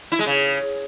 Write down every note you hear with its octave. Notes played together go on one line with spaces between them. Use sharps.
E4
G#3
C#3